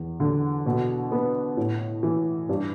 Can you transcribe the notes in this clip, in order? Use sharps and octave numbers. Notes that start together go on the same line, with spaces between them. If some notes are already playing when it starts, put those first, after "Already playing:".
Already playing: E2
D3
B2
B3
A2
E3
G2